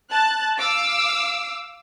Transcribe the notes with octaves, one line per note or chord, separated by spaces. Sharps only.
A5 F#6
F5 D6 E6